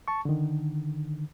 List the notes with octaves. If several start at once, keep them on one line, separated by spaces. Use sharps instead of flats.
A5 C#6
D3 D#3